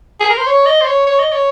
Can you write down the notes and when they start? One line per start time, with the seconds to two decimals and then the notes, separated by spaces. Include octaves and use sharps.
0.20 G#4
0.29 A#4
0.38 C5
0.46 C#5
0.66 D#5
0.81 C5
0.87 C#5
1.06 C#5
1.19 D#5
1.32 C#5